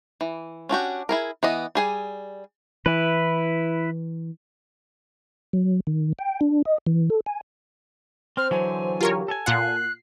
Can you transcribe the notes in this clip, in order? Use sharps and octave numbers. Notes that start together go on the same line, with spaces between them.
E3
C#4 D4 F#4 G4
E4 G#4 A#4
E3 B3 D#5
G3 G#4 G#5
E3 E4 B4
F#3
D#3
G5
D4
D#5
E3
A4
G#5
C4 C5 F6
D3 E3 F#3 G#5
F4 G4 A#4 C#5
A4 G#5
A#2 F4 F#5 F#6 C7